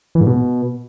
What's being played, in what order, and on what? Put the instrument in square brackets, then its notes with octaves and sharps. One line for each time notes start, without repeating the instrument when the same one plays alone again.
[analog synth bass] E3
G#2
B2